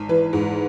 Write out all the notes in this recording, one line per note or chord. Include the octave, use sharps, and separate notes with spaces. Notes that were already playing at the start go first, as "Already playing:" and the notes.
Already playing: G#1
E3 B4
G#2